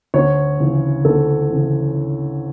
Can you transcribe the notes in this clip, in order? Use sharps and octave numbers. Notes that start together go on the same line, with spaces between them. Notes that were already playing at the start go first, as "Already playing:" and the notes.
D2 C#5
C#3 E3
D2 A4
C#3 E3